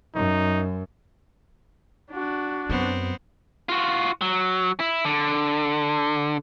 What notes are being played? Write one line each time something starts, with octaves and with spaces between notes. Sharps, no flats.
F#2 D#4
D4 F#4
F#2 B3 C4
F4 F#4
F#3
E4
D3